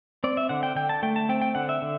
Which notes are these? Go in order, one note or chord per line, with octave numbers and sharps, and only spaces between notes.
C4 D5
E5
D3 F#5
G5
D3 G5
A5
A3 G5
A5
C4 G5
G5
D3 F#5
E5
D3